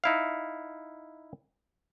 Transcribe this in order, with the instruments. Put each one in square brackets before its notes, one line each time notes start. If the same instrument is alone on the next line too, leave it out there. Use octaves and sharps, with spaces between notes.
[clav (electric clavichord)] D#4 E4 F5